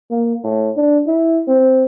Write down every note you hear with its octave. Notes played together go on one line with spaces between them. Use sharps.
A#3
A2
D4
E4
C4